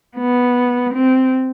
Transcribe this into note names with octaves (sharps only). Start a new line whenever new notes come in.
B3
C4